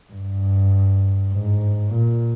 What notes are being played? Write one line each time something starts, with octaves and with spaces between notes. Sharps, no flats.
G2
G#2
A#2